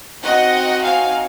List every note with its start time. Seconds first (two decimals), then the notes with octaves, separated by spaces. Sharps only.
0.23 C4 D#4 F#4 D#5 F#5
0.84 F5 G#5